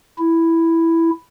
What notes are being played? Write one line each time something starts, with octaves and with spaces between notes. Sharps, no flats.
E4